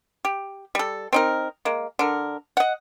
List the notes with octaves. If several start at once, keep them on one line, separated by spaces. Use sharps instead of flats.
G4
G3 A4
C4 D#4 A#4
G#3 A#3
D3 A#4
D#5 F#5